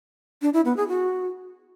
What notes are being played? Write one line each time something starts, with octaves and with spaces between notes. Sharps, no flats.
D4
E4
B3
G#4
F#4